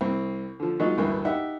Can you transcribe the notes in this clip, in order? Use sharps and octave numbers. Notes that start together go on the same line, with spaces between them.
C2 C4
D3 F3
F#3 G#3 A#3 D#4 F4
A1 D2 G2 A#3 E4
D#4 G4 E5 F#5